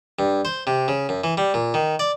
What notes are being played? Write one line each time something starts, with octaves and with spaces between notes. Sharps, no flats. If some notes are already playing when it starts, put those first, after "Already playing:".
G2
C5
C3
C#3
F#2
E3
G3
A#2
D#3
D5